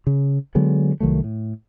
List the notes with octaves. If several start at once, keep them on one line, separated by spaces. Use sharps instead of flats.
C#3
D3 F#3 G#3 B3
C2 D#3 F#3 A3
A2